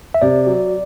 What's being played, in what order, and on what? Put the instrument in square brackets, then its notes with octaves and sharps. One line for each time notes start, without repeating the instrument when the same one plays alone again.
[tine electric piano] E5
[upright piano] C3 [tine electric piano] D5
[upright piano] F#3